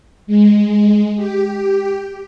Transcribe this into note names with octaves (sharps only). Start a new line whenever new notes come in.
G#3
G4